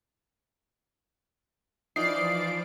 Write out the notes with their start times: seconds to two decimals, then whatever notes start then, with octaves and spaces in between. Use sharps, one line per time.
1.96 E3 F3 D#4 F4 D5 C7 D7